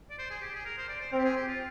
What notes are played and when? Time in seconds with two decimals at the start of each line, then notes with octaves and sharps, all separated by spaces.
0.10 D5
0.19 C5
0.31 G#4
0.42 G4
0.54 G#4
0.65 A#4
0.77 C5
0.89 D5
1.01 C5
1.12 C4 A#4
1.19 G4
1.24 G#4
1.36 G4
1.48 F4